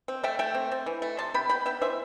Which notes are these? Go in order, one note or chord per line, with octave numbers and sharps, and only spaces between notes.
C4
A3 E5 G5
A3 E5 G5
C4
C4
E3
A3
C3 A5 C6
C3 G5 B5
B3 G5 B5
B3 E5 G5
E3 C5 E5